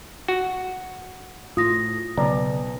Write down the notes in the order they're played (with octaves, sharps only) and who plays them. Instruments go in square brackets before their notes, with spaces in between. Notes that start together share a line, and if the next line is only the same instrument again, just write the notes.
[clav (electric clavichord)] F#4
[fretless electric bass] A2 [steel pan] F4 [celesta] D#6 A#6
[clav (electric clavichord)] B1 [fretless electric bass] C#3 B3 [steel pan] D5 A#5